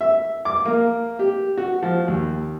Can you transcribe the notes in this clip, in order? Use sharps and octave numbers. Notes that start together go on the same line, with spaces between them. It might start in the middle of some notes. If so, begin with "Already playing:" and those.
E5
D6
A#3
G4
F#4
F3
D#2